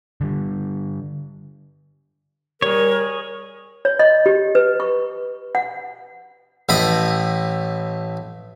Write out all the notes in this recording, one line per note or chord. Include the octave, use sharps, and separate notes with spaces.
D3 G3
G3 G#4 A#4 C#5
C#5
D#5
G4
B4
C#6
F#5
A1 A2 D#5 G5 B5